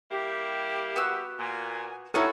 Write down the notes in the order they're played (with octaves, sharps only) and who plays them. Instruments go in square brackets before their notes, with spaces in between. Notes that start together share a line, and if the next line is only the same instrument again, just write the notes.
[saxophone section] G3 A#3 E4 [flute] G4
[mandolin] B3 F#4 E6
[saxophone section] A#2 [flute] G#5
[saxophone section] G3 F#4 [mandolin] B3 C#4 D#4 [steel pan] E4 A4 [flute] C#5